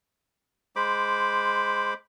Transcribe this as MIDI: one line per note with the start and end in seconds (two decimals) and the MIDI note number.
0.76 1.94 56
0.76 1.94 72
0.76 1.94 83
0.76 1.94 86